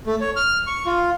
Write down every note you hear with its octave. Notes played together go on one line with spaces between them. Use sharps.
A3
C#5
F6
C#6
F4